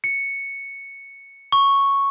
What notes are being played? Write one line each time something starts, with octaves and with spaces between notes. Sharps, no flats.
C#7
C#6